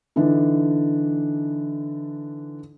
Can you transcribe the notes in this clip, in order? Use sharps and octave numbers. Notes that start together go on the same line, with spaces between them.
D3 E3 D4 D#4